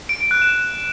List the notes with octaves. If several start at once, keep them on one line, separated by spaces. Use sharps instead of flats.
D7
D7
F#6
E7